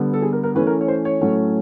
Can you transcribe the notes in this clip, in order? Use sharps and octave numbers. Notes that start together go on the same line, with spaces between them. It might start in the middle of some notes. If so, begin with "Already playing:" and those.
Already playing: D3 G3 B3
A4
G#4
A#4
A#4
E3 A3 C#4 B4
A#4
C#5
C5
C#5
A2 F#3 A3 C#4